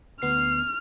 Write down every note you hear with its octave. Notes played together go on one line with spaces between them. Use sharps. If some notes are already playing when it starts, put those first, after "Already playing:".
D2 B3 F6 C7